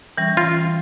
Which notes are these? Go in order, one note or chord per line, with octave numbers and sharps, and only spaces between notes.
E3 G3 C#4
F4